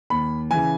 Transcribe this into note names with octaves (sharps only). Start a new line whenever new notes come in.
D#2 B5
C#3 E3 G#5